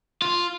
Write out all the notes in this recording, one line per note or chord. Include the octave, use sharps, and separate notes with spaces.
F4